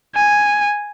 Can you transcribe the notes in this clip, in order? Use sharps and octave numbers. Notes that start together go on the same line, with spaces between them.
G#5